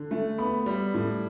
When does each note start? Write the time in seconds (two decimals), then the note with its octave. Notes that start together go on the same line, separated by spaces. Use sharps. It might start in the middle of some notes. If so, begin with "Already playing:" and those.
Already playing: D3
0.11 A3
0.38 B3 B5
0.66 G3
0.94 A2